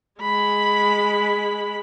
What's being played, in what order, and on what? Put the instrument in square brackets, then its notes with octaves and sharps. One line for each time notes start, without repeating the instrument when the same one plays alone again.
[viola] G#3 B5